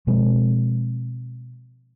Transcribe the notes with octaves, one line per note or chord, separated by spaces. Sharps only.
B2 F3 G#3 C4